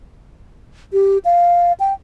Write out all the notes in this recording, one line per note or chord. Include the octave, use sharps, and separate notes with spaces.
G4
F5
G5